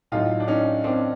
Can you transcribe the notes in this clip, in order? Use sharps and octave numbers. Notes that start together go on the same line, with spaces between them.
A2 F#3 D#4 F4
D4
C#4 D#4
C4 D4